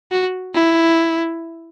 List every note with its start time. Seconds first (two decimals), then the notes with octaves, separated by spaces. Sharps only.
0.11 F#4
0.54 E4